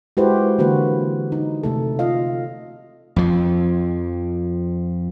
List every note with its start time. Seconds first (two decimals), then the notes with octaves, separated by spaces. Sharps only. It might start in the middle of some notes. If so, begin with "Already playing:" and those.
0.17 G#3 E4 F#4 G4 B4 C5
0.59 D3 E3 A#3 F#4 B4
1.32 D#4
1.63 C3 A3 A4
1.99 F4 D#5 F5
3.16 F2 F3